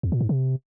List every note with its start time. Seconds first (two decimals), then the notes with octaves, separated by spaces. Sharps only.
0.03 E2
0.12 A#2
0.21 G#2
0.29 C3